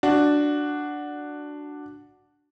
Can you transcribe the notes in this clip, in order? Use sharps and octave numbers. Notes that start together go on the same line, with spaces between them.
D4 F#4